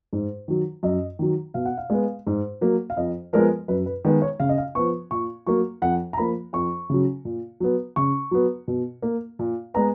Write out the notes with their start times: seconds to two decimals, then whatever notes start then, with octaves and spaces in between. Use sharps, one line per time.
0.13 G#2
0.48 D#3 F#3
0.83 F#2 D#5
1.19 D#3 F#3
1.54 B2 F5
1.65 F#5
1.78 F5
1.90 G#3 B3
2.27 G#2
2.61 F#3 A#3
2.90 F5
2.97 F2 D#5
3.33 F3 G#3 B3 A#4
3.68 F#2 B4
3.86 B4
4.05 D#3 G#3 B3
4.22 C#5
4.40 C#3 F5
4.49 D#5
4.58 F5
4.75 F3 B3 C#6
5.11 A#2 C#6
5.47 F#3 A#3 C#6
5.82 F2 F#5
6.13 A#5
6.18 F3 A#3 B5
6.53 F2 C#6
6.90 C#3 F#3
7.25 A#2
7.60 F#3 B3
7.96 C#3 C#6
8.31 F#3 B3
8.68 B2
9.02 A#3
9.39 A#2
9.74 G#3 B3 A#5